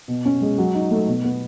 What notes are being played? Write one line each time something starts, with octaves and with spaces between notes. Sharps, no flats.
B2
C#4
G#3
F#3
D#4
A3
B2
B3